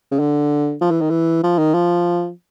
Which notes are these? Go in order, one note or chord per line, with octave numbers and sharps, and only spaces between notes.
C#3
D3
F3
E3
D#3
E3
F3
D#3
F3